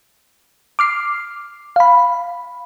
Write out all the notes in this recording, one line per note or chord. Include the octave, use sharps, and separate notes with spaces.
D6 F6 C7
F5 B5